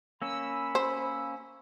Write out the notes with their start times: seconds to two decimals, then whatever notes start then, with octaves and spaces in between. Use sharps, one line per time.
0.22 A#3 C#4 B5 E6
0.75 C5